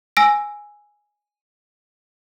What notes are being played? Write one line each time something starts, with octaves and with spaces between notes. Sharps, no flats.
G#5 E6 A#6 D7